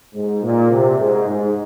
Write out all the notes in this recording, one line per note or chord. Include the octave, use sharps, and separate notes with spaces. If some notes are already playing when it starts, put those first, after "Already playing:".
G#2
A#2
C3
G#2
G#2